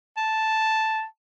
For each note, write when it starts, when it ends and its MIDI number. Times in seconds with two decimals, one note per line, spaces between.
0.17 1.04 81